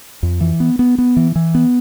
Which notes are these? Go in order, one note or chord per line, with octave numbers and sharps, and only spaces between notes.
F2
E3
B3
B3
B3
E3
E3
B3